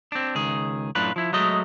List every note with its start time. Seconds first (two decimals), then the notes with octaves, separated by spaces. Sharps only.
0.12 C4 D4
0.35 C#2 D#3 G#4
0.95 F#2 A2 D4 F4 B4
1.16 F3 E4
1.33 F#3 G#3 A3 D#5